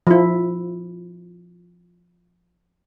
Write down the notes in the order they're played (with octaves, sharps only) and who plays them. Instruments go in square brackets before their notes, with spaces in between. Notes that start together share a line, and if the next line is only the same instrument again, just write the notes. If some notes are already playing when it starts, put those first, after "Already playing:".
[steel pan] F3 E4